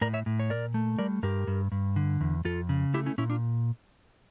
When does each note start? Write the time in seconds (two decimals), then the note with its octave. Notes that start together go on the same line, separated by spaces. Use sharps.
0.01 A2 A#4 D5
0.14 C#5 E5
0.26 A2
0.40 C#5
0.50 A#2 A#4 D5
0.74 A3
0.99 G3 A#4 D5
1.23 G2 G4 A#4
1.47 G2
1.72 G2
1.96 D3
2.21 E2
2.45 F2 F4 A4
2.69 C#3
2.94 A3 E4 G4
3.06 C#4 E4
3.18 A#2 C#4 E4
3.30 D4 F4